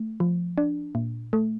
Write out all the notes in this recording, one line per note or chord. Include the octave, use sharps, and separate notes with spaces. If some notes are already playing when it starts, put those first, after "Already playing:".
Already playing: A3
F3
D4
A#2
A3